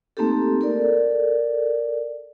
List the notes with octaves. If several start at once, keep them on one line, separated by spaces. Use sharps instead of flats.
A3 A#3 C4 D#4 G4 A4
A4 A#4 D5